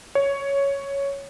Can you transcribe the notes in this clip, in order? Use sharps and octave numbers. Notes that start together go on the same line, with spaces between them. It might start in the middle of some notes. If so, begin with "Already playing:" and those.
C#5